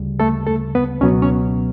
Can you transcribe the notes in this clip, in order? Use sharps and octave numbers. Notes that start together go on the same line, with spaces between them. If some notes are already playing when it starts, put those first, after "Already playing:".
Already playing: D2 C#3 G3
A3 A4
A3 A4
B3 B4
C#2 B2 F#3 B3 C#4 C#5
C#4 C#5